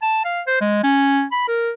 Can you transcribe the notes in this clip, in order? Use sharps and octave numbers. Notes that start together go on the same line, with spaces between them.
A5
F5
C5
G#3
C#4
B5
A#4